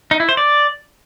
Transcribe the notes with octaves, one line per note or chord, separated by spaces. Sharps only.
D#4
E4
C5
D5